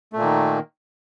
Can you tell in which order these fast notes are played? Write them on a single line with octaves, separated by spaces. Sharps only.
A3 A#2 A#3 D#3